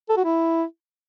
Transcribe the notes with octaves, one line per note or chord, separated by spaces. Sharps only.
A4
F#4
E4